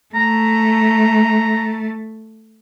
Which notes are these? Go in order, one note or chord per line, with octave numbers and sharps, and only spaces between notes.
A3 A#5